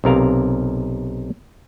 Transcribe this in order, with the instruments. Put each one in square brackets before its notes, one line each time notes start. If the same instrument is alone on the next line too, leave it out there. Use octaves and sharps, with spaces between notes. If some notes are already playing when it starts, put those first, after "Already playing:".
[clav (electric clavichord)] B1 C3 A#4 F5